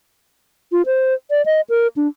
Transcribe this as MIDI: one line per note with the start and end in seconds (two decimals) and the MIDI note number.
0.72 0.82 65
0.86 1.14 72
1.31 1.45 74
1.46 1.61 75
1.70 1.87 70
1.96 2.08 62